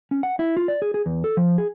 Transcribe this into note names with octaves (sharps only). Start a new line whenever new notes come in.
C#4
F#5
E4
F4
D5
G#4
G#4
E2
A4
F3
G#4